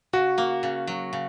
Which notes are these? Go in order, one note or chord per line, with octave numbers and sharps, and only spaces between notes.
C#3 F#4
A#3
C#3
F#3
C#3